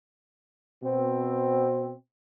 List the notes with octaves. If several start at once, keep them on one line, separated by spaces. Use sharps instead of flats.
B2 C4